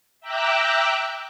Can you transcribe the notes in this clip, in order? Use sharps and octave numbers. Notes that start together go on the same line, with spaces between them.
E5 G5 A#5 D6 E6 F#6